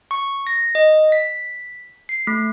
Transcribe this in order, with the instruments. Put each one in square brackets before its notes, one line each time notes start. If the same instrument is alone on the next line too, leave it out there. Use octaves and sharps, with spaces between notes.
[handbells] C#6
A#6
D#5
B6
C7
A3